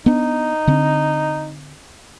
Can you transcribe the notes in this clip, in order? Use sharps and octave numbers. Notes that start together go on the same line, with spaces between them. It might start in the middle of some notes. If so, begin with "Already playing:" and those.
B3 D4 D#4
D3 C4 D4